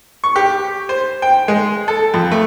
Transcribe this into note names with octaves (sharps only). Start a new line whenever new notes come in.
C#6
G4
C5
G5
G#3
A4
F2
A3